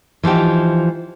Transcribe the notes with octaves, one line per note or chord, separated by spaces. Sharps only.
E3 F3 D#4 G4